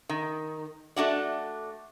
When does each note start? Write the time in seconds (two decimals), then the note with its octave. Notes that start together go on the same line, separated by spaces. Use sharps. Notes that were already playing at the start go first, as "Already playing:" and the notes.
0.09 D#3
0.96 A3 D4 F#4 D5